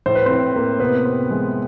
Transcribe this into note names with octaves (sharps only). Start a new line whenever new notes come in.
A2 C5
B4
A2 C4 C5
A#3
C3 B3 B4
C4
G#3